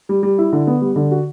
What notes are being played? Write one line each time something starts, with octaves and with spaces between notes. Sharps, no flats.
G3
G3
E4
D3
B3
G3
D3
F#4